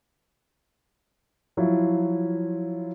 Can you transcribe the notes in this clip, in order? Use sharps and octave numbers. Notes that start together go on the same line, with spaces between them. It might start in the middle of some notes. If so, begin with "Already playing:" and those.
F3 F#3 E4 F4